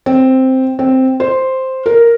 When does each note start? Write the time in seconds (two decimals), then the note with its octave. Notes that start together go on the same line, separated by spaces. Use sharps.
0.06 C4
0.79 C4
1.20 C5
1.86 A#4